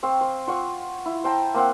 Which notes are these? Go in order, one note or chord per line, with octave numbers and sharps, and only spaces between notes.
C4 F5 C#6
C5
F4 F#5 C#6
E4
C5 G5 A5 A#5
A#3 C4 F5 F#5